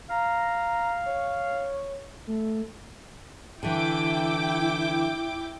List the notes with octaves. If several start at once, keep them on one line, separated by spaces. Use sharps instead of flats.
F5 A#5
C#5
A3
D3 E3 E4 G5 D6